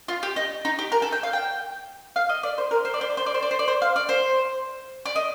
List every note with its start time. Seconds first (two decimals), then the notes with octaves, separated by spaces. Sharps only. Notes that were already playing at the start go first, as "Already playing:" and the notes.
0.08 F4
0.23 G4
0.36 D#4
0.65 D#4
0.79 G4
0.92 A#4
1.02 A4
1.12 G5
1.23 F5
1.33 G5
2.16 F5
2.29 D#5
2.43 D5
2.58 C5
2.71 A#4
2.85 C5
2.94 D5
3.01 C5
3.10 D5
3.17 C5
3.26 D5
3.34 C5
3.43 D5
3.51 C5
3.59 D5
3.68 C5
3.82 F5
3.96 D5
4.09 C5
5.06 D5
5.16 D#5